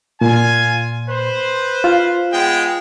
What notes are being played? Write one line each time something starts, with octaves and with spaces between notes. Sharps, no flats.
A#2 F4 G#5
B4 C5
F4 F5
G#3 B3 G5